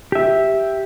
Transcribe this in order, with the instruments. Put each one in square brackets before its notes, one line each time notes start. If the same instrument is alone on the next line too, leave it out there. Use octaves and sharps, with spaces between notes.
[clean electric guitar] G4 E5